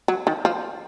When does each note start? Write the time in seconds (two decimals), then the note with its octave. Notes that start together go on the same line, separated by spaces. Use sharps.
0.08 F#3
0.27 D#3
0.45 F3